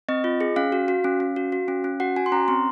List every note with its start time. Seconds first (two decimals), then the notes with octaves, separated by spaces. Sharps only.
0.09 C4 D#5
0.24 F4
0.41 G#4
0.56 C#4 F5
0.72 F#4
0.88 F#4
1.04 C#4
1.20 C#4
1.36 F#4
1.52 F#4
1.68 C#4
1.84 C#4
2.00 F#4 F#5
2.16 F#4 G#5
2.26 C6
2.32 C#4 A#5
2.48 C4 C6